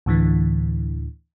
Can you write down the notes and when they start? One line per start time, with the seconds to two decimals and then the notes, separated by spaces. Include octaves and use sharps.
0.06 D2 A2 D3 E3